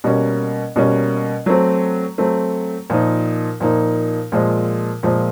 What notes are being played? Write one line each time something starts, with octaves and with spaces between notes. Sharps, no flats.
B2 G3 A#3 C#4
B2 G3 A#3 C#4
F#3 A3 C4
F#3 A3 C4
A#2 F3 A#3 D#4
A#2 F3 A#3 D#4
A#2 F3 G#3
A#2 F3 G#3